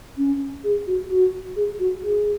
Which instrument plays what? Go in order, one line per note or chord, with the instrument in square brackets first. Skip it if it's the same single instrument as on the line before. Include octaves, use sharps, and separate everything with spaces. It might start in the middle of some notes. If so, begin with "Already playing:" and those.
[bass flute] C#4
G#4
F#4
F#4
G#4
F#4
G#4